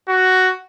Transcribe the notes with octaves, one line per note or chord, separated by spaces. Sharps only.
F#4